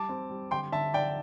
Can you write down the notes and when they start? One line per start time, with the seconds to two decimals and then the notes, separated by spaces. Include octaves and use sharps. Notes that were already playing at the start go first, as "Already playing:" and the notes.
Already playing: G3 A5 D6
0.09 C4
0.30 G3
0.51 D3 G5 C6
0.72 D3 E5 A5
0.94 D3 D5 G5